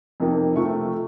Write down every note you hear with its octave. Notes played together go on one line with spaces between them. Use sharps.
F2 C3 F3 A#3 D#4
C3 F3 A3 C#6